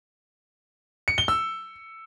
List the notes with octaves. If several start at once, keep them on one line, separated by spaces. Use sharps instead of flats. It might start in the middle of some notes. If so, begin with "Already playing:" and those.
C#7
G7
E6